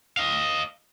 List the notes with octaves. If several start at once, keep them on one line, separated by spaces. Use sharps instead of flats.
D#5 F5